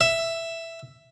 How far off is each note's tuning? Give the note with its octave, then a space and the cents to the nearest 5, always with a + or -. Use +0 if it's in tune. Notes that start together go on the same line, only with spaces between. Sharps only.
E5 +5